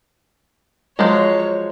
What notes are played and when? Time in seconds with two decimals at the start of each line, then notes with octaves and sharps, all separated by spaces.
0.99 F3 F#3 G#3 C#5